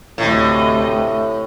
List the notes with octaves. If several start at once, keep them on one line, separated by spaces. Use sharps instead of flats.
D2 A2 C3 D#5